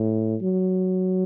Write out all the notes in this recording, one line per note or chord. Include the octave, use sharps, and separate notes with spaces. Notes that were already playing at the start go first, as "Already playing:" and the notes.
Already playing: A2
F#3